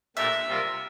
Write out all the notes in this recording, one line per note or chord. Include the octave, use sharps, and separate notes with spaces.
A#2 A3 D4 G4 A#4 E5
C3 G3 C4 F4 A#4